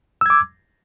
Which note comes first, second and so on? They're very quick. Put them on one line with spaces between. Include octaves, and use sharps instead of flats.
E6 G#6 D6